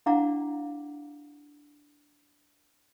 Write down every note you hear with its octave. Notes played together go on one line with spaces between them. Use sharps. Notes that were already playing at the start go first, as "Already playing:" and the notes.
D4 E4 F5 F#5 A#5 D6